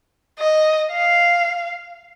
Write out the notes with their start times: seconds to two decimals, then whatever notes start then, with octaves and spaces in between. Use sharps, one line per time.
0.39 D#5
0.92 F5